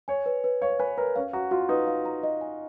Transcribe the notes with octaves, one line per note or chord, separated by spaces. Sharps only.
C#5 G#5
B4
B4
C#5 F5
B4 G#5
A#4 B4
C#4 F5
F#4 A#5
F4 F#4
D#4 B4
F5
A#5
D#5
G#5